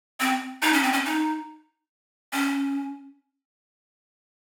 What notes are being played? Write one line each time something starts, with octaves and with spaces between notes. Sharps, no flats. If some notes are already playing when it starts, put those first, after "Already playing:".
C4
D#4
C#4
C4
C#4
D#4
C#4